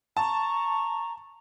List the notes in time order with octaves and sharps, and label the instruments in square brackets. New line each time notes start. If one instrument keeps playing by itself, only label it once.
[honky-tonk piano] A5 [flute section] A#5 C#6